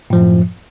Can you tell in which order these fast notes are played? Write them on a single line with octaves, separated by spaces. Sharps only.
A2 F3 F#2